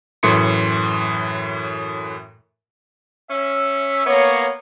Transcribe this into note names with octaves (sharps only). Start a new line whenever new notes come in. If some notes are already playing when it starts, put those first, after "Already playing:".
F#2 A2 E3 C6 C#7
C#4 E5
A#3 B3 C#5